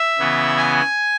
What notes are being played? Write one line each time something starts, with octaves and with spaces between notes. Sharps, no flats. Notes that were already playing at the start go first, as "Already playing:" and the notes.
Already playing: E5
C#3 E3 B3
G#5